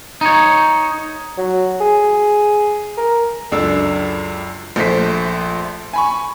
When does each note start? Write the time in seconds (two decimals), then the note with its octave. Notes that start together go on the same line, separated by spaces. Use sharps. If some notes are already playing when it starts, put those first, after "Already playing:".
0.21 D#4 C#5
1.38 F#3
1.81 G#4
2.97 A#4
3.52 C#2 F#2 D4 A4 E6
4.76 A#1 F3 A3 C5 B6
5.93 G#5 B5 C#6